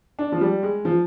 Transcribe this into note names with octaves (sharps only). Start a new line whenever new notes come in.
D4
F3
G3
G#3
F3